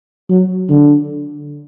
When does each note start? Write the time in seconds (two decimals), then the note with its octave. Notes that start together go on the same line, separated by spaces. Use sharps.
0.30 F#3
0.70 D3